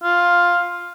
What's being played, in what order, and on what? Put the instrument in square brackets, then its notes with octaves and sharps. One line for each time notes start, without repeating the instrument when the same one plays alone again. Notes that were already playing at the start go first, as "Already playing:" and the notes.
[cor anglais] F4